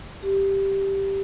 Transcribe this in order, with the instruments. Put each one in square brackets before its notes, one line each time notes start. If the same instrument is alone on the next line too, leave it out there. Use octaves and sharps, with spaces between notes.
[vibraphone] G4